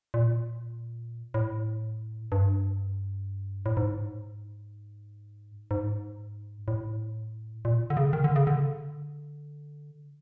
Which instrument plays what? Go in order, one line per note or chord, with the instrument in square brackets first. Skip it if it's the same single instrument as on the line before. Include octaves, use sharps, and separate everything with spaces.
[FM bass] A#2
A2
G2
A2
G#2
G#2
A2
A#2
D3
C#3
D#3
D3
C#3
D3